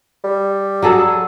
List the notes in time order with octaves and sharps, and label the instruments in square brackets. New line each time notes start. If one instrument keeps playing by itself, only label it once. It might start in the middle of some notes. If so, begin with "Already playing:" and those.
[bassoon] G3
[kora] F#3 G#4 A4